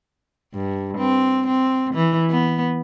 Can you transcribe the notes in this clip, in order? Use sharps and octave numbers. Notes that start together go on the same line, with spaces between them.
G2
C4
C4
E3
B3